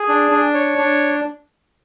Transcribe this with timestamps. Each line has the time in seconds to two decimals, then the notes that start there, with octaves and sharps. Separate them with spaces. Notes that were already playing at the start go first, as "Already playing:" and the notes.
Already playing: G#4
0.08 D4
0.31 D4
0.54 C#5
0.78 D4